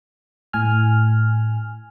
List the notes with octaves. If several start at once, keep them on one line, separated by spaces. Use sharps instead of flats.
A2 G#5 F6